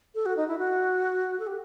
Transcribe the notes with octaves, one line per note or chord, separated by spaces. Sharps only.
A4
F#4
D#4
E4
F#4
A4
G4